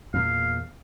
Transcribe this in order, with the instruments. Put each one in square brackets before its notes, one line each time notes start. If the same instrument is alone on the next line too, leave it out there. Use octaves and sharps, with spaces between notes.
[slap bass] E2 A#2 [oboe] F5